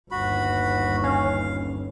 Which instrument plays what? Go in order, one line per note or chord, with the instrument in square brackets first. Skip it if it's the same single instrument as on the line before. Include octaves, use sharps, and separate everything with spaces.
[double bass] G1 D#2 [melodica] F#4 B5
[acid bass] C#4 [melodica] F5